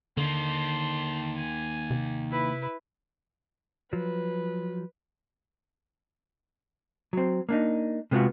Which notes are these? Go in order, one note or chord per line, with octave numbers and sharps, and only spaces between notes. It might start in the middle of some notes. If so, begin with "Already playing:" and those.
D3 D#3 A#3 A5 C6
G#5
C3
E4 B4
F3 F#3 B4
F#3 C4
A#3 D4 D#4
C3 G#3 B3 F4 F#4